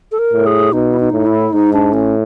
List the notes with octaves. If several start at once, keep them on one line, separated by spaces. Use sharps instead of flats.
A4
A#4
A2
G#4
B2 D#4
E4
D#4
A2
E4
G#2 D#4
D4
A2 C#4